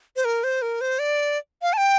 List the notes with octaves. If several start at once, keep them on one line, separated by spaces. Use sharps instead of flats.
C5
A#4
C5
A#4
C5
D5
F5
A5
G5